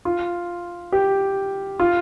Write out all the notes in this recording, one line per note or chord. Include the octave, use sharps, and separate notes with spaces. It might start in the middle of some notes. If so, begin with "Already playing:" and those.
F4
G4
F4